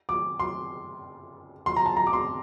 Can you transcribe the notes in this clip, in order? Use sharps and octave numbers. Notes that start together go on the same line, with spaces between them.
D6
C6
C6
A#5
A5
A#5
D6
C6